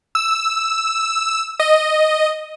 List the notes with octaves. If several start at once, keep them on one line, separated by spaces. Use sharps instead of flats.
E6
D#5